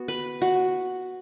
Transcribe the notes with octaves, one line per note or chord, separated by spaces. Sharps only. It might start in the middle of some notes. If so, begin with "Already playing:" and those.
Already playing: B3 F#4
B4
F#4